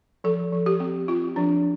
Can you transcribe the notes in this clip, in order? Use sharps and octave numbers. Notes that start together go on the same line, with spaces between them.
F3 A4
F3
G4
C4
C4 F4
F3 D4